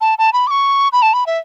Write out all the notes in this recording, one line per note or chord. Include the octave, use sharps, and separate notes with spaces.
A5
A5
B5
D6
C#6
B5
A5
B5
E5